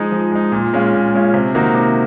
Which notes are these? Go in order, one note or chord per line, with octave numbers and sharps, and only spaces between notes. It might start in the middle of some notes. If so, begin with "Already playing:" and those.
Already playing: F3 G#3 D#4
F3
G#3 D#4
A#2
G#3 C#4 F4
A#2
G#3 C#4 F4
C3
D#3 A#3 D#4 F#4
C3